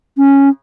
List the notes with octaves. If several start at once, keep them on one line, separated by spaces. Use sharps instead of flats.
C#4